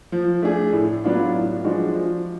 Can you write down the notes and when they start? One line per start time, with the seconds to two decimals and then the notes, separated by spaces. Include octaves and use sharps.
0.12 F3
0.42 A3 D4 G#4
0.73 A2
1.04 F#3 B3 D4 F4
1.33 A2
1.64 F3 G#3 D4 F#4
1.94 F3